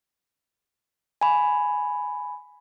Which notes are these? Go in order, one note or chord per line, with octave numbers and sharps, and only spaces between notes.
G#5 B5